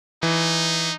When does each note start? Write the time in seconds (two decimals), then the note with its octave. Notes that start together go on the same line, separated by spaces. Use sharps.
0.23 E3 D#4